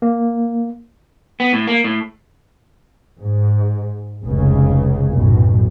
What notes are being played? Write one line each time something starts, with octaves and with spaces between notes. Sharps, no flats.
A#3
B3
A2
A#3
A2
G#2
F1 C#2 C#3
B1 F#2 A2